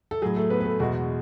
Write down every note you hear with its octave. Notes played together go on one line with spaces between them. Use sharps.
A4
A2 F#3 G#4
A3 A4
B3 B4
B4
A3 A4
E2 B2 G#3 F#4